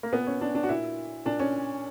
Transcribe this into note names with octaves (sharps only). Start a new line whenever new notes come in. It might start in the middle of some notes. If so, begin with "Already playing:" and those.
A#3
A#2 B3
C#4
D4
D4
F#4
A#2 E4
A#2 D4
C#4